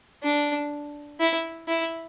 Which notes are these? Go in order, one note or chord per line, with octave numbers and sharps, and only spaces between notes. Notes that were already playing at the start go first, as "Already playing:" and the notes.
D4
E4
E4